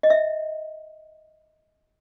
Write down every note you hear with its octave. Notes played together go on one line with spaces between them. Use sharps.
D#5
E5